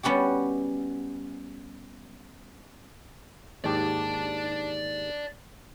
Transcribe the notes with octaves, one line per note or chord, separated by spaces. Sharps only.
G3 B3 C#4 F#4 G4
D#2 G#2 G4 D5 A5